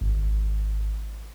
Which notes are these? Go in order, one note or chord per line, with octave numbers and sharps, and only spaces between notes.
G#1